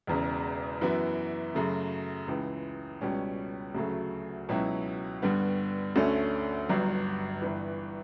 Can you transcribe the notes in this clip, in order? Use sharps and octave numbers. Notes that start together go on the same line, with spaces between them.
E1 E2 C#3
F#2 E3 B3 E4
F#2 C#3 F#3 A3
C#2 C#3 E3
C#2 B2 G3 C#4
D2 C#3 F#3 A3
C#2 B2 F#3 C#4 E4
G2 D3 G3 B3
D2 D3 A3 C#4
G1 G2 F#3
G1 G2 E3